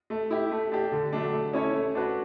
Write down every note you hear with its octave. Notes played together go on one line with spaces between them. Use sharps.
A3
E4 G4
A3
D4 G4
D3
F#3 A3 D4
A3
C#4 E4 A4 C#5
A3
D4 F#4 B4